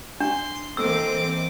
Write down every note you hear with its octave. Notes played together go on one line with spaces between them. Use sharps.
D4 C6
E3 A#3 C4 A4 D#5 D6 E6